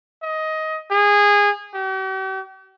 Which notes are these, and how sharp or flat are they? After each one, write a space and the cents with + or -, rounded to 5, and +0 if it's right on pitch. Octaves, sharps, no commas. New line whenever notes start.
D#5 +15
G#4 -20
G4 -45